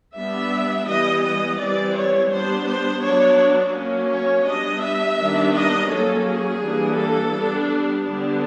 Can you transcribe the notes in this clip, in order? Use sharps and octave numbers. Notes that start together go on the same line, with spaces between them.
G3 B3 D4 E5
E3 G3 B3 D#5
D#5
E3 G3 C4 D5
C#5
G3 B3 D4 C5
C5
F#3 B3 D4 C#5
F#3 A#3 C#4
C#5
G3 B3 D4 D#5
E5
D#3 G3 B3 D4
D#5
F#3 A#3 C#4 A4
G#4
E3 G3 A#3 D4
A4
G3 B3 D4
D3 G3 B3 D4